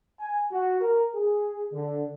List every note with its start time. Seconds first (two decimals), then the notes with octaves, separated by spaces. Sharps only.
0.20 G#5
0.52 F#4
0.81 A#4
1.15 G#4
1.73 D3